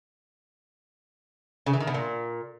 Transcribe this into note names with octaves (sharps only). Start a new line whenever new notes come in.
C#3
E3
D#3
B2
A#2